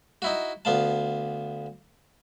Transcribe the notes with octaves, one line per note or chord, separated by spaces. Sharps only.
D#4 E4 F#4
D2 B3 F4 A5